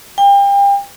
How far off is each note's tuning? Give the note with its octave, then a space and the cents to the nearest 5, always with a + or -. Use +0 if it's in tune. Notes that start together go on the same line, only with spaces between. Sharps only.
G5 +35